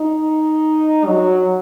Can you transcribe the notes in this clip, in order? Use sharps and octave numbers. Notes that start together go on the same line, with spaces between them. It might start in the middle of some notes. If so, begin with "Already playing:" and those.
Already playing: D#4
F#3